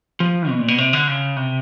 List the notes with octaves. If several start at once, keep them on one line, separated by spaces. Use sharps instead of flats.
F3
B2
A#2
B2
C3
D3
C#3
C3